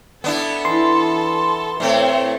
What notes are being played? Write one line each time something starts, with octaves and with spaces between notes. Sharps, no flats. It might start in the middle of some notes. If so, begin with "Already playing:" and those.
B3 D4 E4 A4
E3 C6
A2 A3 C4